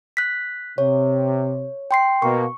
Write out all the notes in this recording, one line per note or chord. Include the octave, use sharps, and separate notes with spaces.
F#6 B6
C3 C#5
G5 C6 C7
B2 A#3 C#6